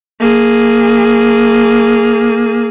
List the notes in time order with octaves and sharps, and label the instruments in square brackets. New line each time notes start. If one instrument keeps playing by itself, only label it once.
[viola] A#3 G#4